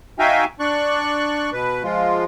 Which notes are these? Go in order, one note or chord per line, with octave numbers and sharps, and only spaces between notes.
D#4 F#4 E5 F5 G5 G#5
D4 D5 C#6 F#6
B2 B4
F3 G#3 F4